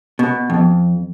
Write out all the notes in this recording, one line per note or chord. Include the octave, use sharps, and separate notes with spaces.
B2
F2